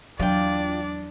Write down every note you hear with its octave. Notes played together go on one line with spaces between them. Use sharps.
E2 F#3 D4 F4 D5 G5